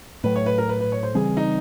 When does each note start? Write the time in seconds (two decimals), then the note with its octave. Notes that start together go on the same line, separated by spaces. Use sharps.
0.24 A2 F#3 A3 B4
0.36 C#5
0.46 B4
0.58 A#4
0.69 B4
0.80 B4
0.92 C#5
1.03 C5
1.15 C#3 E3 G3 C4 G#4
1.37 D#4